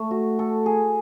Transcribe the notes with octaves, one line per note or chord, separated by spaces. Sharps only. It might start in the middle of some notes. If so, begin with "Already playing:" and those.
Already playing: A3
F#4
A4
G#4